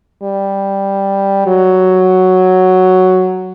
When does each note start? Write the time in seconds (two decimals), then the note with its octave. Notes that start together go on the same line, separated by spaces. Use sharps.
0.23 G3
1.47 F#3